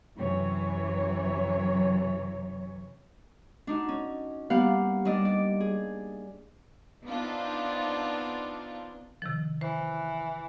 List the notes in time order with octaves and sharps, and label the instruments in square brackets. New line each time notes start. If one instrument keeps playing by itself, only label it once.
[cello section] F#2 C3 E3 F#3 C#5
[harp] D4 D#4 F#4
C#4
G3 A#3 B3 G4 F5 F#5
G3 D4 D5 D#5
D5
G#4
[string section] B3 C4 D4 D#4 F4
[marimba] C3 D#3 F3
[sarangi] E3 [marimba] C5